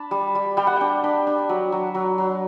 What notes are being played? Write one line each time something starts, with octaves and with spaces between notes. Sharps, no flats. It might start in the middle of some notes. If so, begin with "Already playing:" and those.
Already playing: D4 A5 B5
G3
G3
G3 G5
F#5
D4 G5
D4 B5
D4
F#3 B5
F#3
F#3
F#3